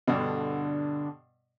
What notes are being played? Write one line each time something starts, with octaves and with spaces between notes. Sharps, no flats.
G2 B2 D3